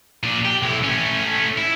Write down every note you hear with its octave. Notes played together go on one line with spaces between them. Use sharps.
A#2 D4
G4
B1 E4
A3 C#4
E4